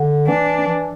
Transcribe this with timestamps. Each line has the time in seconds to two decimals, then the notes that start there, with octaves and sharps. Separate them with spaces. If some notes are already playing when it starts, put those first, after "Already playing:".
Already playing: D3
0.27 E3 D4
0.68 E3